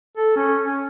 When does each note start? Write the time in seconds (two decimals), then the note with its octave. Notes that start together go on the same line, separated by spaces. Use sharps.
0.17 A4
0.36 C#4
0.65 C#4